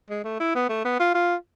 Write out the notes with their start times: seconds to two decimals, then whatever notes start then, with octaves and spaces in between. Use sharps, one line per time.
0.10 G#3
0.24 A3
0.40 E4
0.55 B3
0.69 A3
0.85 B3
0.99 F4
1.14 F4